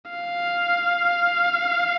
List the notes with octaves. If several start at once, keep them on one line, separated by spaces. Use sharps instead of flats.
F5